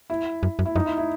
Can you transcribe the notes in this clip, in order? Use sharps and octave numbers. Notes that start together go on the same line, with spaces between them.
E4
F#2
F#2
E4
F#2 D#4
E4
E4